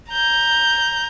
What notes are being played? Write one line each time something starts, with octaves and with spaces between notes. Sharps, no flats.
A#5 G6